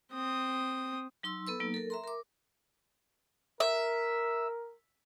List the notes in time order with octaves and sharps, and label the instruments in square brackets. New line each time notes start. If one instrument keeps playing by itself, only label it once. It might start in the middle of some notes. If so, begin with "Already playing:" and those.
[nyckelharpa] C4 D#6
[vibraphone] F#3 D#4 C6 E6
B3 A4 B4 E6
F#3 A#3 D#4
A4 A#4
E5 A#5 C6
A#4 D6
[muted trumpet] A#4 [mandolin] E5